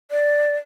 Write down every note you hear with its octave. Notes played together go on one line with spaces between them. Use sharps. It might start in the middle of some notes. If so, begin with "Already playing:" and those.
D5